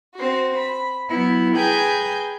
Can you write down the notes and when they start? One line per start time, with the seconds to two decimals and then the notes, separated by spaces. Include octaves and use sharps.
0.15 C4 F#4
0.57 B5
1.09 F#3 B3 E4
1.55 G#4 B4 G5 G#5 A#5 G6